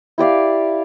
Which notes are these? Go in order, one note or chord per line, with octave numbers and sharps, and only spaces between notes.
E4 G4 D5 F5